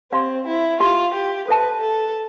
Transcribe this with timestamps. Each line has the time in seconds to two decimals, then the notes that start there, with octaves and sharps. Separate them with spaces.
0.12 C4 G4 D5 F5 C6
0.47 E4
0.80 F4 G4 D5 F5 C6
1.14 G4
1.48 A4 B4 C5 E5 A5
1.81 A4